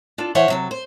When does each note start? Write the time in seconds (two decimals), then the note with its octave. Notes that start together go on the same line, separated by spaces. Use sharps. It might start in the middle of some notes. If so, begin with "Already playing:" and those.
0.18 D4 F4 A4
0.35 E3 C5 C#5 E5 F#5
0.48 C3 F#3 A4
0.71 C5